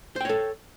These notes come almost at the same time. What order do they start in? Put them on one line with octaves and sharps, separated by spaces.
C5 G5 C#5 A4